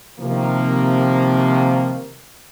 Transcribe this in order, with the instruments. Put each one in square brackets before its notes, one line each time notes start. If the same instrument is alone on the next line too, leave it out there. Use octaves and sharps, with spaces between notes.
[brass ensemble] C3 D#3 F3 A#3